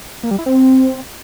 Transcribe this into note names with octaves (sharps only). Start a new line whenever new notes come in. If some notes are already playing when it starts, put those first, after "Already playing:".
A#3
G3
E4
C4